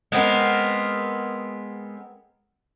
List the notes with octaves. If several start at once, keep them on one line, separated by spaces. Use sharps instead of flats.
G#3 B3 C4 A#4